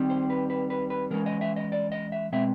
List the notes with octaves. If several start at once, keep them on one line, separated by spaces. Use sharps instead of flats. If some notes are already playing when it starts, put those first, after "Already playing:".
Already playing: D#3 G3 C4
C5
B4
B4
B4
B4
E3 G#3 C#4 A#4
D#5
E5
D#5
D5
D#5
E5
B2 G#3 C4 E5